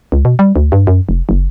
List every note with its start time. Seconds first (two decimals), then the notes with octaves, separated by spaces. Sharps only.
0.12 C#2
0.25 B2
0.39 G3
0.56 D2
0.72 G2
0.87 F#2
1.09 F1
1.29 F#1